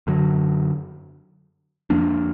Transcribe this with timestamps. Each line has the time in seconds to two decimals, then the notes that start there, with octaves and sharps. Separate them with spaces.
0.07 F#2 D3 F#3
1.90 F2 F3 A#3 D4